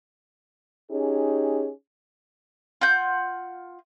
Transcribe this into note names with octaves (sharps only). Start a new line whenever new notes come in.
C#4 D#4 G4 G#4
F4 F#5 G6